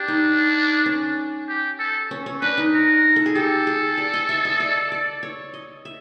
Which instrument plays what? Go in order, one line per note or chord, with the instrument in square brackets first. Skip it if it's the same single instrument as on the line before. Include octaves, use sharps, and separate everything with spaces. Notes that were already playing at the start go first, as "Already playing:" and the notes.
Already playing: [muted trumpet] D4 [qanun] G4
[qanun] D#4
C#4
[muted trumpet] G4
A4
[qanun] C#4
C#4
[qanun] D4 [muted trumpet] B4
[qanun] D#4
[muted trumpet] A#4
[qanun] A4
G#4
[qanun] G4 [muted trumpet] A4
[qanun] G#4
D5
D#5
E5
D#5
D5
D5
C#5
D#5
E5